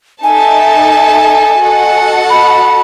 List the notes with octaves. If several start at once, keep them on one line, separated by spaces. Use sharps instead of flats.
D#4 A4 E5 G#5 A5
F#4 A4 D#5 F#5 A5
B5